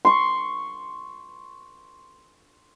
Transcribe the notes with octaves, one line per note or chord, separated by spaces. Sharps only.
C6 C#6